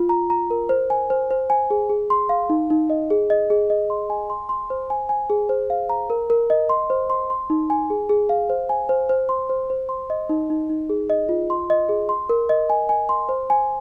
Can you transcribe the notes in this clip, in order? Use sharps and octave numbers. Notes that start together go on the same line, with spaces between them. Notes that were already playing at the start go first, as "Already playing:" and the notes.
Already playing: F4
A#5
A#5
A#4
C5
G#5
C5
C5
G#5
G#4
G#4
C6
F5
D#4
D#4
D#5
G#4
D#5
G#4
D#5
C6
G#5
C6
C6
C5
G#5
G#5
G#4
C5
F5
A#5
A#4
A#4
D#5
C6
C5
C6
C6
D#4
G#5
G#4
G#4
F5
C5
G#5
C5
C5
C6
C5
C5
C6
D#5
D#4
D#4
D#4
G#4
D#5
F4
C6
D#5
G#4
C6
A#4
D#5
G#5
G#5
C6
C5
G#5